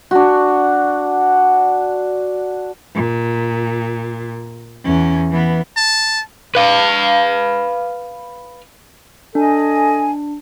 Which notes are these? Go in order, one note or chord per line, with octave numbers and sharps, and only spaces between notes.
D4 F#4
A#2
E2 C#4
E3 B3
A5
B4 F5
D4 A4 D#5 G#5